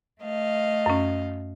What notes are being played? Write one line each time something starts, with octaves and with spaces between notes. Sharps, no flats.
A3 D#5 F5
F#2 C#4